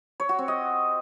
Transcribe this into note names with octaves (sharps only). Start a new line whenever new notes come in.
C#5
F#4
C4
D#5